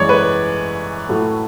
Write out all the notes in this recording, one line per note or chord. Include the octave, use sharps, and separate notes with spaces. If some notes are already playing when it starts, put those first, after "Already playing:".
Already playing: F#2 E3 G#3 C#5 D5
B4
A2 F#3 A3